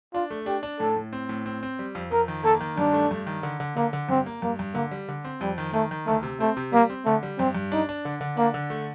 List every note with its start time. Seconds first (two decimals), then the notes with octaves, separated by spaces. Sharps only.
0.14 D4 F4
0.31 A3
0.46 D4 G4
0.63 D4
0.80 A2 A4
0.96 A2
1.13 C4
1.29 A2
1.46 C4
1.63 C4
1.79 G3
1.95 F2
2.11 F2 A#4
2.28 D#3
2.44 A#3 A4
2.61 D#3
2.78 G2 D4
2.93 A3
3.11 G2
3.27 D#3
3.43 D3
3.60 D3
3.76 D3 A#3
3.93 D3
4.09 G2 C4
4.26 A#3
4.42 G2 A#3
4.59 G2
4.74 D3 A#3
4.91 G3
5.08 D3
5.25 C4
5.41 F2 G3
5.58 D#3
5.73 D#3 A3
5.91 D#3
6.07 D2 A3
6.23 C3
6.40 A3 C4
6.57 C3
6.73 G3 A#3
6.90 C4
7.06 D3 A3
7.23 G3
7.39 G2 C4
7.55 G2
7.72 D4 D#4
7.89 D4
8.05 D3
8.21 D3
8.37 A#3 D4
8.54 D3
8.70 A3